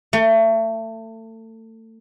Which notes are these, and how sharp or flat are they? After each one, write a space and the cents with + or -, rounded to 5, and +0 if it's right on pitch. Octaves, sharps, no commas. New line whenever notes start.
A3 +30